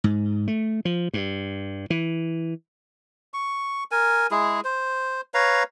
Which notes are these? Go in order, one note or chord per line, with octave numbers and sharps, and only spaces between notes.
G#2
A3
F3
G2
E3
C#6
A#4 G#5
G#3 E4 G#4
C5
B4 C#5 F5 A#5